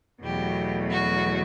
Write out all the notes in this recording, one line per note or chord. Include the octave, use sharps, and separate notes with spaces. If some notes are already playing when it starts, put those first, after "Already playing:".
E2 B2 F#3 A3 G4
F#4